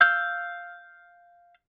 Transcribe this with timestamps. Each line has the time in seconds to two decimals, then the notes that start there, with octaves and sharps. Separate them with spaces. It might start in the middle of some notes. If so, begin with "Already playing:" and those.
0.01 F5 E6 F6 G6